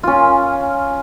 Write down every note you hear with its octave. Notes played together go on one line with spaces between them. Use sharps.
C#4 F4